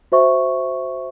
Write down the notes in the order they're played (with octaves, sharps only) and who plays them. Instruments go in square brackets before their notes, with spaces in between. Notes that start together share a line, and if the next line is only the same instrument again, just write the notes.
[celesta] F#4 C5 E5 C#6